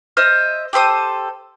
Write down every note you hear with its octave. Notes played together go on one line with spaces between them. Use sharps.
C5 D#5 E5 F6
G4 A4 C5 D#6